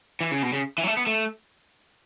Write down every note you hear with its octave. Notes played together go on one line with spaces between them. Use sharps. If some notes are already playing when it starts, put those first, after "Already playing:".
E3
C#3
B2
C#3
E3
F#3
A3
B3
A3